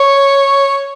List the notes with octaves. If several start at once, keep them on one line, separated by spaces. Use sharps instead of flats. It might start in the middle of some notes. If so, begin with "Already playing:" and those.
Already playing: C#5